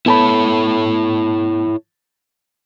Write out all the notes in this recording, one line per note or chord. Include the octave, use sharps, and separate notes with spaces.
B3 E4 A4 C#5 A5 B5